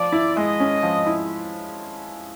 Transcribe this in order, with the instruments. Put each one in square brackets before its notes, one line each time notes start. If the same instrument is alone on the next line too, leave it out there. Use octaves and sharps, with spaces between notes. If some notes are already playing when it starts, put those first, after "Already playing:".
Already playing: [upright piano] F3 [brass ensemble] D5
[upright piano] E4
[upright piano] G#3 [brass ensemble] D#5
[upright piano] C#4
F3
E4